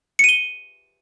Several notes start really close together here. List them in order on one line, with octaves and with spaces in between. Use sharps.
C#7 D#7 G7